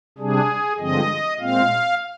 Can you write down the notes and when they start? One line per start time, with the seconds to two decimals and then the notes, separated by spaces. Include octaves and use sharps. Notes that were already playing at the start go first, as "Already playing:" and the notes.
0.18 C3 G3 D4 G#4
0.79 G2 D3 F3 G#3 C4 D#5
1.40 A#2 G#3 C4 F5